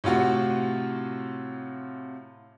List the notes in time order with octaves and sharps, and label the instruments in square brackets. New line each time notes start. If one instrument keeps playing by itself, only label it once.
[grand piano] A2 C3 F4 F#4